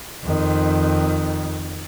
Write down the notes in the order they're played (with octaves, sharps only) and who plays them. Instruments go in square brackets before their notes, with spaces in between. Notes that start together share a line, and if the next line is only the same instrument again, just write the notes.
[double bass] F2 D#3